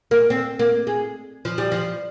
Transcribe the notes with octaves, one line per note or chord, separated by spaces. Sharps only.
A#3
C4
A#3
G#3
F3
G3
F3